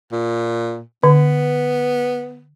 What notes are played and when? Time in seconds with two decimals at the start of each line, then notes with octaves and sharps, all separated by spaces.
0.12 A#2
1.04 D3 B3